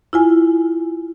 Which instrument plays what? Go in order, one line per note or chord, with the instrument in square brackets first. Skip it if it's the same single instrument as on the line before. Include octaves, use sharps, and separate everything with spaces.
[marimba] E4 F4 G#5